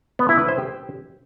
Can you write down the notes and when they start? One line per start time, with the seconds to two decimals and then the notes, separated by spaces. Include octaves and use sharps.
0.19 B3
0.29 E4
0.39 B4
0.48 C5
0.58 G4